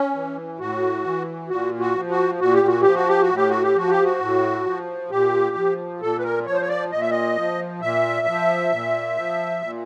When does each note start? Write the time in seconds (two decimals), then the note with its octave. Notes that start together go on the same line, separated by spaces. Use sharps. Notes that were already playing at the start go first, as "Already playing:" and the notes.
Already playing: C#4
0.14 E3
0.59 A2 F#4
1.05 E3
1.49 A#2 F#4
1.80 F#4
1.95 F3
2.10 F#4
2.40 A#2 F#4
2.54 G4
2.67 F#4
2.81 F3 G4
2.95 F#4
3.08 G4
3.22 F#4
3.30 A2
3.36 G4
3.49 F#4
3.63 G4
3.75 F3 F#4
3.91 G4
4.04 F#4
4.21 A2
4.65 F3
5.11 A#2 G4
5.56 F3
6.01 A#2 A4
6.18 B4
6.24 A#4
6.46 F3 C#5
6.54 C5
6.61 C#5
6.68 D5
6.92 A#2 D#5
7.01 E5
7.11 D#5
7.36 F3
7.81 A#2 E5
8.27 F3
8.72 A#2
9.17 F3
9.62 A#2